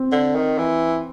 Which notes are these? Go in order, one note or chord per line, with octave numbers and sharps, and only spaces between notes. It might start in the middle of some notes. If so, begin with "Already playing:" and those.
Already playing: C4
D3
D#3
E3